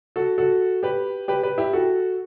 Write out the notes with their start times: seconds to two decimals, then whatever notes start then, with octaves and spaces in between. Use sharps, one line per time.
0.16 F#4 A4
0.38 F#4 A4
0.83 G4 B4
1.28 G4 B4
1.43 G4 B4
1.58 E4 G4
1.73 F#4 A4